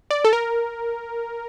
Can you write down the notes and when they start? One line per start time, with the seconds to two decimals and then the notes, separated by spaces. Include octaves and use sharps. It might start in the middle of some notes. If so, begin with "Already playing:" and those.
0.10 D5
0.25 A4
0.33 A#4